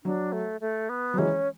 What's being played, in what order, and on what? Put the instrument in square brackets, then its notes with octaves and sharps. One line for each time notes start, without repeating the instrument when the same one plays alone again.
[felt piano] F#3 [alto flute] D4
[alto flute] A3
A3
B3
[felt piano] F#3
[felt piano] E3 G#3 [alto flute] C#4